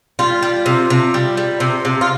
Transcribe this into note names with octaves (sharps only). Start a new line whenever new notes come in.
G3 F4
G3
C3
C3
G3
G3
C3
C3
F4